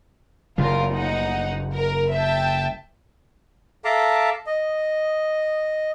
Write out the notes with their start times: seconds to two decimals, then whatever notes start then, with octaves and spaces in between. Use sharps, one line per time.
0.58 F#1 C#3 G3 F4 A#4
0.93 D#4 F#5
1.74 A#4
2.14 E5 G5 A5
3.85 A4 E5 F5 A5 A#5 D6
4.47 D#5